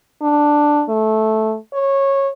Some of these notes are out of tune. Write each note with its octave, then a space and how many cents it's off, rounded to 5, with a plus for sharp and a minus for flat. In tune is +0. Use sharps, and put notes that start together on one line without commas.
D4 +5
A3 -10
C#5 -15